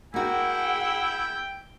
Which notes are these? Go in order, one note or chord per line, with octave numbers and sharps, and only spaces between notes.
A#3 E4 F#4 G#4 F#5 G5